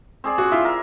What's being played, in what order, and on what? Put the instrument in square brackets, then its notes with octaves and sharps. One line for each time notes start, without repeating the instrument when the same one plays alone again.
[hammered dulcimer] C4 G#4 D5
[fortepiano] F#4
E4 F4
[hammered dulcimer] A#4 E5